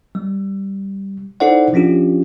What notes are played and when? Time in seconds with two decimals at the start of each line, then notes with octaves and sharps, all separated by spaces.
0.15 G3
1.40 D#4 E4 A4 C5 D5 F#5
1.73 F3 C#4 D4 F4 G4